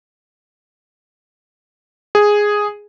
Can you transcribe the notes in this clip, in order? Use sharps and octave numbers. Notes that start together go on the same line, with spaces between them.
G#4